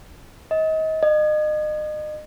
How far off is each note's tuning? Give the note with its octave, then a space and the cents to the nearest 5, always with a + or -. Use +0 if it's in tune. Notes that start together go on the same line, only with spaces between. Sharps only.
D#5 +30
D#5 -35